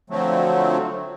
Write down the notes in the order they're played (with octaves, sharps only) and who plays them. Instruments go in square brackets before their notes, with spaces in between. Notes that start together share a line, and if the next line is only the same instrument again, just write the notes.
[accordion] D3 F3 F#3 A3 C4